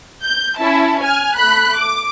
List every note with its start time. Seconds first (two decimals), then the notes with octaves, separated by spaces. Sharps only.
0.23 G6
0.58 C#4 E4 A5
1.02 G#5 F6
1.36 A3 B5 F#6
1.77 D6